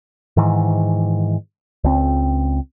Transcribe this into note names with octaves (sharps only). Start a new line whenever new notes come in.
G#2 D#3 E3
C#2 C4